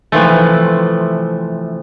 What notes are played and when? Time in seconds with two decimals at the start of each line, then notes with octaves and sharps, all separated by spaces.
0.12 C3 E3 F3 A3